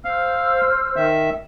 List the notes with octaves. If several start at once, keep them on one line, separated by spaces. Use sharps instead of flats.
C5 F5 E6 F6
D#3 E5